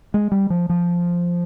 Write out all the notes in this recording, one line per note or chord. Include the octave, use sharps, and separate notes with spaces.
G#3
G3
F3
F3